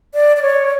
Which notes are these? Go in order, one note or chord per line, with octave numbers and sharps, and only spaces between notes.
D5
D5
C#5